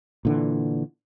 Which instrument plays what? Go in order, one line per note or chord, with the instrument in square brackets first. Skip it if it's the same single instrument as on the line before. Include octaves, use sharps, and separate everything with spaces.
[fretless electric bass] A#2 D3 E3